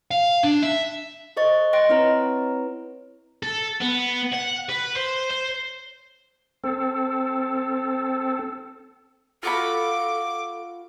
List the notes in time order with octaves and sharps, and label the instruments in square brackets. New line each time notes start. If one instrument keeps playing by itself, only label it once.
[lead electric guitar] F5
D4
E5
[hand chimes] A4 C5 D#5 C#6 A6
D#5 G5 C6 F#6 A#6 D7
C4 E4 B4 C#5 A#5
[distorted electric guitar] A4
B3
F#5
B4
C5
C5
[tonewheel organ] C4 A4
[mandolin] F4 F#4 B5 [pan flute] A4 [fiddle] D6